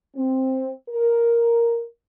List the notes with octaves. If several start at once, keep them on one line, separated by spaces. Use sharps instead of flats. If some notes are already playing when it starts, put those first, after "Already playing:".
C4
A#4